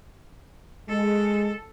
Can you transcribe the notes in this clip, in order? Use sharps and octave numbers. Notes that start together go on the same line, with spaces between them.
G#3 A4